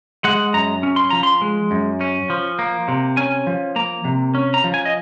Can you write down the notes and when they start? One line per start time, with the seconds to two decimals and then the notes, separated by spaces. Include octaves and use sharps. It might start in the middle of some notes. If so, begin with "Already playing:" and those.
0.24 G#3 F#5
0.54 F#2 A#5
0.83 C#4
0.96 C6
1.10 F3 A#5
1.23 C6
1.42 G#3
1.71 F#2
2.01 C#4
2.30 F3
2.59 A#3
2.88 C3
3.17 C#4 G#5
3.47 F3
3.76 A#3 A#5
4.05 C3
4.35 C#4
4.54 A#5
4.64 F3
4.74 G#5
4.85 D#5